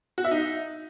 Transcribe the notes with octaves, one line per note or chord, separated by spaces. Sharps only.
F#4
E5
D#4